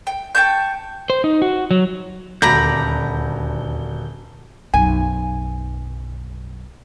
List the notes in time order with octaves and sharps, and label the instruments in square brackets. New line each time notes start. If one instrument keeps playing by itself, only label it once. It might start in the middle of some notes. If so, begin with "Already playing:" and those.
[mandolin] G5
G5 A5 C#6 G6
[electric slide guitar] C5
D#4
F#4
F#3
[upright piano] D#1 F#4 [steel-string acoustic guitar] D2 [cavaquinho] D5 A#5 B5 [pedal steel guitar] G6
[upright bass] B1 F#2 [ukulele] G#5